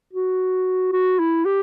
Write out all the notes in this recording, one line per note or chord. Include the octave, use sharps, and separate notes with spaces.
F#4
F#4
E4
G4